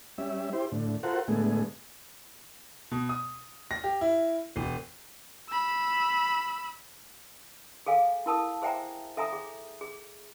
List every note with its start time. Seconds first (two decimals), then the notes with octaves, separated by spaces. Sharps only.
0.18 G3 C#4 E5
0.53 E4 G4 C5
0.72 A2 D3
1.03 F4 F#4 A4 A#4 C5 F#5
1.28 A2 D3 G#3 A3 B3 G#4
2.91 B2
3.09 D#6
3.71 A#6
3.84 G4
4.01 E4
4.56 E1
5.49 B5 E6
7.86 G#4 A4 F5 G#5
8.26 E4 A#4 A5 D#6
8.62 G#4 C5 E5 G5 G#5 A#5
9.17 A4 E5 G#5 A#5 D#6
9.33 G#4
9.81 G#4